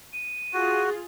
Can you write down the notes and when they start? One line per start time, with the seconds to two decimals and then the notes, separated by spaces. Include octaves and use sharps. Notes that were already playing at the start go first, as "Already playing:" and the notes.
0.13 D#7
0.53 F4 F#4 G#4